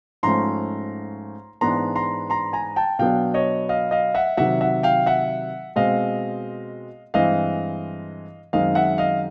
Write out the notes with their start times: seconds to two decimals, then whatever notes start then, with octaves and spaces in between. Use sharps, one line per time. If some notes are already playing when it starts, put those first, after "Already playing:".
0.23 G#2 F3 A3 C#4 A#5 C6
1.61 G#2 E3 G#3 B3 D4 A#5 C6
1.96 A#5 C6
2.30 A#5 C6
2.53 G#5 A#5
2.76 G5 A5
2.99 B2 F#3 B3 D4 F5 G5
3.34 C#5 D#5
3.69 D#5 F5
3.91 D#5 F5
4.15 E5 F#5
4.37 C3 D#3 F#3 E5 F#5
4.61 E5 F#5
4.83 F5 G5
5.06 E5 F#5
5.76 B2 G#3 C4 D#5 F5
7.14 G2 E3 G#3 C4 D#5 F5
8.53 F#2 D#3 G#3 C4 D#5 F5
8.75 E5 F#5
8.98 D#5 F5